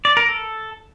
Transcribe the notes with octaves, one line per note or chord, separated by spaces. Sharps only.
D5
A#4
A4